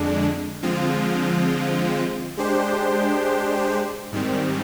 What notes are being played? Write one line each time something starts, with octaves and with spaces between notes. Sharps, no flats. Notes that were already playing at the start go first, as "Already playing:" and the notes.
Already playing: F2 D3 G#3 D4
D3 F3 G#3 C4 F4
G#3 D4 G4 C5
G#2 D#3 G3 C4